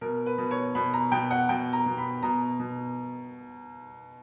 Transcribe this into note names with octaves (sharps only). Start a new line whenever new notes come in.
B2 A#4
B4
B2
C#5
B2 B5
A#5
B2 G5
F#5
B2 G5
A#5
B2
B5
B2 A#5
B2